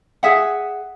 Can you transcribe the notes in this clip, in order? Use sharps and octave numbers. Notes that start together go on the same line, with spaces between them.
G#4 E5 F#5